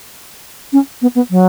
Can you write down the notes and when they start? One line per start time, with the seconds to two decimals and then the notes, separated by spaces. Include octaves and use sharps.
0.73 C#4
1.02 B3
1.15 B3
1.31 F#3